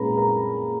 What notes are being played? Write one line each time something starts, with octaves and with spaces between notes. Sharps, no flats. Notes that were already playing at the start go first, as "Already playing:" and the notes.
Already playing: A#2 G#3 C#4 B4 A#5 B5
A#4 A#5